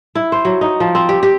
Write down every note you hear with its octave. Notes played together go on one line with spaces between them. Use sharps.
E4
C5
F#3
D#4
F3
C4
G4
G4